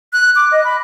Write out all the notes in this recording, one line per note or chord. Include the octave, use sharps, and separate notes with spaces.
F#6
D6
D#5
B5